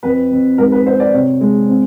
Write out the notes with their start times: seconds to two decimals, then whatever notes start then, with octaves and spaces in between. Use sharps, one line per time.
0.03 F2 B4
0.31 F2
0.58 G#2 A#4
0.72 B4
0.86 C4 C5
1.00 D5
1.13 C3 C#5
1.41 G#3
1.69 C4